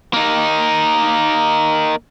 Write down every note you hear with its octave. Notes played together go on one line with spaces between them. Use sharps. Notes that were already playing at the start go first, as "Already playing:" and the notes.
A#3 D#4